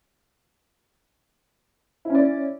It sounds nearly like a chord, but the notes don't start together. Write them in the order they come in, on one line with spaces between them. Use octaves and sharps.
E4 C#4 D5